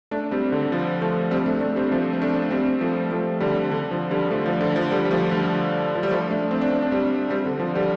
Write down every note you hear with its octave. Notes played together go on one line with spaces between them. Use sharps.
A3 D4
G3 C4
D3
F3
F3 A3
G3 C4
A3 D4
A3 D4
G3 C4
F3 A3
C4
A3 D4
G3 C4
F3 A3
F3 A3
D3 G3
D3
F3
D3 G3
F3 A3
F3
D3
F3
D3 G3
G3
F3 A3
D3 G3
F3
G3
F3 A3
A3 D4
C4
D4
C4
D4
G3 C4
G3 C4
D3
F3
D3 G3